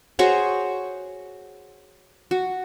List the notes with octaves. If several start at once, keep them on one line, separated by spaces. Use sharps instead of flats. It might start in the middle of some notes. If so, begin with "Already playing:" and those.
F#4 G#4 C5 C#5
F#4